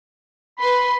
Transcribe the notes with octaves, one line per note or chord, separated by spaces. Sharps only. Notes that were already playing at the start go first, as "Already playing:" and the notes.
B4 B5 C6